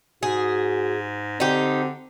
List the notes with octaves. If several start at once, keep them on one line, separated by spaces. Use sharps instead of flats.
G#2 F#4 G#4
D3 C4 D#4 G4